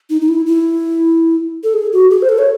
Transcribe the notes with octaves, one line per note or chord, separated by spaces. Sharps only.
D#4
D#4
E4
E4
A4
G#4
F#4
G#4
C5
A4
C#5